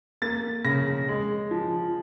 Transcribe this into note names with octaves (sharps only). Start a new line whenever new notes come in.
A#3 A6
C#3 A#6
G#3
F3